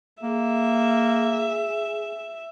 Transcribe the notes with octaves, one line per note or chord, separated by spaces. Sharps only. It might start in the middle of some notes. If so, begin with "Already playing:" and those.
A#3 G#4 E5